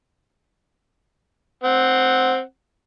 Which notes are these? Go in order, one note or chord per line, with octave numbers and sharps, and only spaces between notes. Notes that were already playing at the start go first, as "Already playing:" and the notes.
C4 F#5